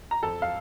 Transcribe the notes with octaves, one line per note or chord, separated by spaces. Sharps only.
A#5
F2 A4 A5
F5